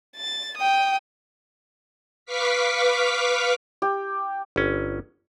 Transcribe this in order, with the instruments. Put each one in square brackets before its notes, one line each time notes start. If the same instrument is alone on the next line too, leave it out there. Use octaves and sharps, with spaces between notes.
[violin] A6
G5 D#6
[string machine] B4 F5 C#6 D6 F6 B6
[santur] G4
[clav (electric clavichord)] G1 C#4